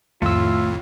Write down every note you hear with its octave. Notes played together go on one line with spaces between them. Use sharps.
C2 F2 A2 D#3 A3 F4 E6